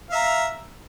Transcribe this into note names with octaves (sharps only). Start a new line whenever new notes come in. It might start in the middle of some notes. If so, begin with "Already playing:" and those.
E5 F5 A#5